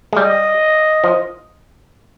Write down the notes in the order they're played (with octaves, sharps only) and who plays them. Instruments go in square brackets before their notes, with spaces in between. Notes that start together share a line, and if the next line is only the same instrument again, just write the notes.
[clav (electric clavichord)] G#3
[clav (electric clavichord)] G3 [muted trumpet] D#5
[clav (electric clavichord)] F3